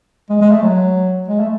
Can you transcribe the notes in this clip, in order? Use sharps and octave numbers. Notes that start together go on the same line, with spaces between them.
G#3
G#3
A3
F#3
G#3
A3